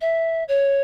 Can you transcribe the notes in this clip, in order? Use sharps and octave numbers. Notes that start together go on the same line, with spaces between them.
E5
C#5